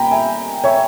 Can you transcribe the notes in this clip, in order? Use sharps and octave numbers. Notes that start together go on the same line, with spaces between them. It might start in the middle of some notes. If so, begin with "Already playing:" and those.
Already playing: A#2 G3 A#3 G5 G#5 A#5 B5
E5 G#5
C#5 E5